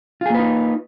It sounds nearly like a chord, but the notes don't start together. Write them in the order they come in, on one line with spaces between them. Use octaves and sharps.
F4 G#4 A#3 B4 D#4